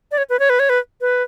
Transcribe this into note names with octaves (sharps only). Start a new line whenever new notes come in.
D5
C#5
B4
C#5
B4
C#5
B4
B4